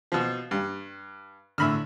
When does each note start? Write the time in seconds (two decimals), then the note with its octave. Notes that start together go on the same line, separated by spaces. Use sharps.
0.12 B2 F3
0.51 G2
1.58 A2 D3 E5 B5 F6